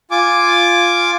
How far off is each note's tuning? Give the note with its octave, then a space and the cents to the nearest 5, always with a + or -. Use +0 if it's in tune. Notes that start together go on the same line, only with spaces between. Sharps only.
F4 +0 G#5 -5 D6 +0